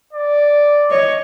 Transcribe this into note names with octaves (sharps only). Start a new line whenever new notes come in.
D5
C#5 D#5